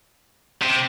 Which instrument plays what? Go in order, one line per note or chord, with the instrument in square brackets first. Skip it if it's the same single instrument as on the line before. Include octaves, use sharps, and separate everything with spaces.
[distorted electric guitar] C3